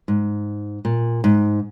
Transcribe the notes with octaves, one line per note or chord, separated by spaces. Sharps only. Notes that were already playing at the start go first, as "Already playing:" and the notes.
G#2
A#2
G#2